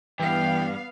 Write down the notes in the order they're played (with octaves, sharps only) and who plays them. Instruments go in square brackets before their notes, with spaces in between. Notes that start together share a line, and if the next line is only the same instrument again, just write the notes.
[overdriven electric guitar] G2 [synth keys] E3 [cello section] B3 F5 [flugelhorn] G5